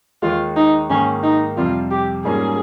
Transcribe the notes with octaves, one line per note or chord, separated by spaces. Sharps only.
D#2 D#3 G#3 F4
D#4
G#2 D#3 A#3 C#4
D#4
F2 C3 G3 C4 F4
G4
G#2 G3 A#3 C#4 F4 G#4